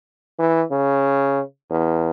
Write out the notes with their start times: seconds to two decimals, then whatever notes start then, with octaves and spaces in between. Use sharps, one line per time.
0.39 E3
0.71 C#3
1.71 E2